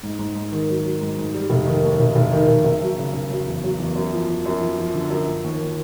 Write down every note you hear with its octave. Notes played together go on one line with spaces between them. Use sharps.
G#2
G#2
G#2
D#3
F#3
F#3
G#2
G#2
G3
F1
D#3
D#2
F1
F1
D#3
F1
F#1
F#3
C#3
F#1
F#3
E2
F#3
E2
F#2
F3
F3
F#2
F3
F3
D3
F#2
F3
D#2
F3